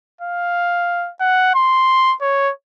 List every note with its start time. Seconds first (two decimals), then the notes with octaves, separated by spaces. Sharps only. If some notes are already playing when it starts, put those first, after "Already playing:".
0.21 F5
1.21 F#5
1.55 C6
2.22 C#5